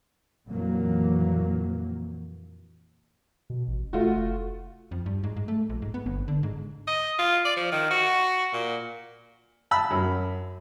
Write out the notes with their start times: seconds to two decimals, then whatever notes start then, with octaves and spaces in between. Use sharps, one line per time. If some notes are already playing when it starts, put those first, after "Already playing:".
0.48 F2 A#2 E3 F#3 A#3
3.50 B2
3.68 A1
3.93 F1 A3 F4 F#4
4.91 F2
5.06 G2
5.23 G#2
5.36 G#2
5.48 A3
5.69 A#1
5.82 G#2
5.94 B3
6.06 G1
6.28 D3
6.43 G#2
6.88 D#5
7.19 F4
7.45 D5
7.57 F3
7.72 D#3
7.91 F#4
8.53 A#2
9.71 A5 B5 E6
9.91 F#2